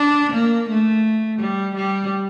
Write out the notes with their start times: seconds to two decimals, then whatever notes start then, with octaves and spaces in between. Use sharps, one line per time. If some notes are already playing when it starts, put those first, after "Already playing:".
Already playing: D4
0.33 A#3
0.69 A3
1.39 G3
1.75 G3